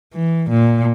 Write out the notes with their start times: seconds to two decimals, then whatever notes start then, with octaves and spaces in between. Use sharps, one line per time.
0.14 E3
0.50 A#2